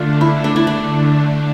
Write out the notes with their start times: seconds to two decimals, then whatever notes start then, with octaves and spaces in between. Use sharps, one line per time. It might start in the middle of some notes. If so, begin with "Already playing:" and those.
Already playing: D3 A3 D4 F4
0.21 E4
0.44 D4
0.56 E4
0.67 D4